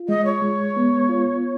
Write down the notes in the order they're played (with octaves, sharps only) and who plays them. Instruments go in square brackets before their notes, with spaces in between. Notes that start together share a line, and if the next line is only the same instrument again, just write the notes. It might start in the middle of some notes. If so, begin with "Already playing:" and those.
Already playing: [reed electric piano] F4
[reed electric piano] G#3 [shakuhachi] D#5
[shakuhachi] C#5
[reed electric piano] G#3
B3
F4